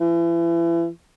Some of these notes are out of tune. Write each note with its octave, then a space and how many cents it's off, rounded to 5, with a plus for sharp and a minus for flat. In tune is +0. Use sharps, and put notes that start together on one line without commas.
E3 +35